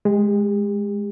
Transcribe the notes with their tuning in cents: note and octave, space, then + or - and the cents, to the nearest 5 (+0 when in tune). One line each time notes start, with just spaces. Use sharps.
G#3 +0 G4 +40